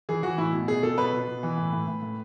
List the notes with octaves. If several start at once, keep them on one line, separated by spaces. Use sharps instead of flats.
E3 G#4
E3 F#4
A2 E4
B2
B2 G#4
B2 A4
B2 B4
B2
B2
E3
A2
A2
A2
A2